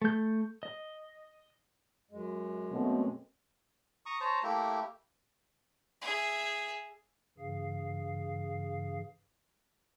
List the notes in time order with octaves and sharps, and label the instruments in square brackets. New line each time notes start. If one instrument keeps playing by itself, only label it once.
[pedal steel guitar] A3 G6
D#5
[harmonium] F#2 G#3
[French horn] B2 [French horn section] A3 C4 C#4
[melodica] A#5 C#6 D#6
C5 C#5 A5 A#5
A3 A#3 E4 G4
[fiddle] G#4 E5
[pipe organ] G2 C#3 E3 G#4 F5